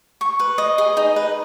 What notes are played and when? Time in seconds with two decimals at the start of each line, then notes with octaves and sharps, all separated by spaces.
0.21 C#6
0.40 B4
0.58 D#5
0.78 G#4
0.97 D#4
1.16 B4